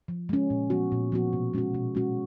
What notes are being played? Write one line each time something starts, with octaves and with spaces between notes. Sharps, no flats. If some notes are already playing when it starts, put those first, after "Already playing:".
F3
G#3 C#4
A#2
F3 B3 F#4
A#2
F3 B3 F#4
B2
G#3 C#4 F#4
B2
G#3 C#4 F#4